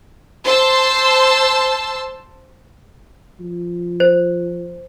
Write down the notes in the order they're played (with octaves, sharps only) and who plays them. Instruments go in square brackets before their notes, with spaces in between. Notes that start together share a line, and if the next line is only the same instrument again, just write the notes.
[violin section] C5 A5 C6 E6
[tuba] F3
[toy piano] C5